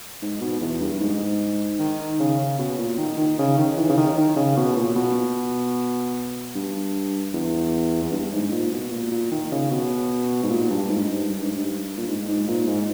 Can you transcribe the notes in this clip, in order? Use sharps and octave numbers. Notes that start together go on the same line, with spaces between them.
G#2
B2
E2
G2
G2
G#2
D#3
C#3
B2
A#2
D#3
D#3
C#3
D#3
E3
C#3
D#3
D#3
C#3
B2
A#2
B2
G2
E2
E2
G2
G#2
A#2
B2
A#2
A#2
D#3
C#3
B2
G#2
A#2
G2
G#2
G2
G2
G#2
G2
A#2
G#2
G#2
A#2
G#2